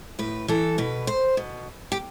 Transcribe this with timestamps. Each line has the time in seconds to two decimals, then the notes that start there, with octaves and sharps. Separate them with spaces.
0.19 A2 B4
0.48 E3 A4
0.78 B2 B4
1.07 C5
1.37 B2
1.92 G4